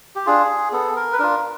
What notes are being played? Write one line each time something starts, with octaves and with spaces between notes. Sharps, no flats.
G4
D4 F4 G#4
B3 A4
A#4
B4
D4 F4 A#4